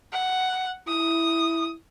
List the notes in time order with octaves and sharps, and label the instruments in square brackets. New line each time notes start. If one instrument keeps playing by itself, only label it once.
[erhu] F#5
[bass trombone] E4 [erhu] D#6